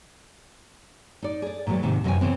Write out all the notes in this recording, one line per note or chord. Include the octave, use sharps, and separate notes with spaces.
D#4 D5
G#4 D5
A#2 E3 F#3 G#3 G4
D#2 G#2 C3 D#3
F#2 C3 E3 D#5 G5 G#5
C#3 E3 B3 C4